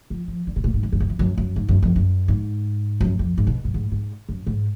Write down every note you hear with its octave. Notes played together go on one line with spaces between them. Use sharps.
F3
F3
D3
B2
A#2
G#2
F#2
F2
F#2
F2
F#2
F#2
G#2
F#2
F2
F#2
G#2
F#2
F2
G#2
B2
F#2
G#2
G#2
F#2
G#2